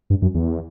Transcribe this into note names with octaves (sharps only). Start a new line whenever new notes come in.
G2
F#2
E2